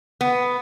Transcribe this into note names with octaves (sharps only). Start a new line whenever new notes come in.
B3